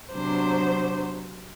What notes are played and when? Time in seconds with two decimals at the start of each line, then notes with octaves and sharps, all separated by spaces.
0.11 C3 F#3 B3 D4 C5